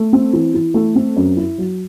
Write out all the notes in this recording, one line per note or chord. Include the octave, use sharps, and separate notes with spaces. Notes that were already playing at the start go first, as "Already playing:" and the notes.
Already playing: A3
C4
E3
E3
A3
C4
F#2
E4
F#3